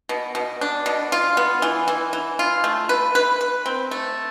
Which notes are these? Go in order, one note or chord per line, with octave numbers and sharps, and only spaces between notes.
B2
B2
D4
B2
F4
B3
E3
E3
E3
F4
A3
B4
B4
B4
C4
A3